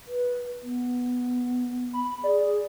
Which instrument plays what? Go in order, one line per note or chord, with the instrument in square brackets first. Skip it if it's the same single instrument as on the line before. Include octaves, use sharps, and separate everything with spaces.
[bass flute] B4
B3
[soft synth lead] B5
[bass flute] G#4 [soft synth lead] D5